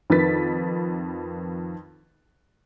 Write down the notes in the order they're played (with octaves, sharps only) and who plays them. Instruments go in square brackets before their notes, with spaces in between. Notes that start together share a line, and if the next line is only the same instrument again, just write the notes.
[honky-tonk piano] F2 D#3 B4 A6 B6